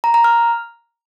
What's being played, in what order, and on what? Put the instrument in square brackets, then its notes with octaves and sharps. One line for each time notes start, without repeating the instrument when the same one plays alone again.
[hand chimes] A#5
A#5
F6